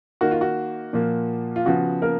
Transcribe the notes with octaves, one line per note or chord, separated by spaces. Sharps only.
D#3 A#3 F#4
F4
F#4
A#2 F3 A#3
F4
C#3 F3 B3 F#4
A#3 A#4